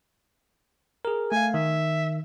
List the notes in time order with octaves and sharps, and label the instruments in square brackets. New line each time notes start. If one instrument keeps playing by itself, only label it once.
[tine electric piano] G#4 A#4
[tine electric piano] A3 F5 [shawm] G#5
[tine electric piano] D#3 [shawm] E5